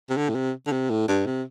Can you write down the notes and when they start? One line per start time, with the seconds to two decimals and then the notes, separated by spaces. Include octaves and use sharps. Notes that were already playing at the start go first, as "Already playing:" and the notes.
0.10 C3
0.17 D3
0.29 A2
0.35 C3
0.67 D3
0.72 C3
0.90 A2
1.08 G2
1.26 C3